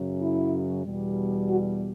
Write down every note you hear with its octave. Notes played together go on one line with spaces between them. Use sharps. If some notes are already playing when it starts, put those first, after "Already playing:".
Already playing: F#2 C#3 F#3
E4
E2 B2 G3
F#4